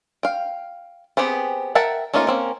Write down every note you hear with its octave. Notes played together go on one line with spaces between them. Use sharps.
F5 G5
B3 C4 G4 G#4
A#4 E5 F#5 G5 A5
A3 A#3 C#4 D#4 F4
A#3 C4 C#4